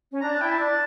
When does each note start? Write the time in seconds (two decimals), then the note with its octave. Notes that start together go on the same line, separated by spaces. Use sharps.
0.11 C#4
0.21 D4 A#5
0.31 A5
0.39 E4 G5
0.51 A5
0.58 D4